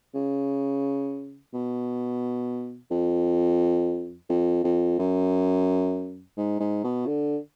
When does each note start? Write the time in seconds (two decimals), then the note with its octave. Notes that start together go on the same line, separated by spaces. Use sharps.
0.14 C#3
1.54 B2
2.91 F2
4.30 F2
4.64 F2
4.99 F#2
6.38 G#2
6.60 G#2
6.84 B2
7.07 D3